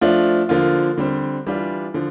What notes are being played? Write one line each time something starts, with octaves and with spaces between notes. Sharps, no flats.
F3 A3 D4 F4
D3 F3 A#3 F4
D3 G3 C4
E3 G3 D4 F4
D3 F3